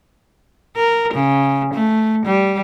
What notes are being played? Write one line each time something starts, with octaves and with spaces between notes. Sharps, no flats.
A#4
C#3
A3
G3